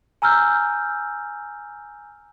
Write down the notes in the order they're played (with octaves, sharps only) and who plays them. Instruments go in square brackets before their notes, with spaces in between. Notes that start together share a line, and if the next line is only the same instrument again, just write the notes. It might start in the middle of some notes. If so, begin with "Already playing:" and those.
[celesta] G#5 A#5 E6 F6 G6